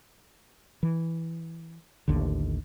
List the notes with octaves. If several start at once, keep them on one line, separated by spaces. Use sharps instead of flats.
E3
A1 D#2 D3